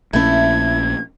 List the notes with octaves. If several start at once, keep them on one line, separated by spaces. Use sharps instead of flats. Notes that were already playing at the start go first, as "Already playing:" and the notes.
A#1 A3 A#3 C#4 E4 G#6